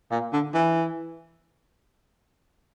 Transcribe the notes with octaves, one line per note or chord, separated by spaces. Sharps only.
A#2
D3
E3